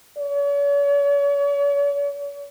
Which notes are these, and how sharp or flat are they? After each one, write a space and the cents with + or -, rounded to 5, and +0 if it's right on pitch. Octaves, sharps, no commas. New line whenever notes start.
C#5 +45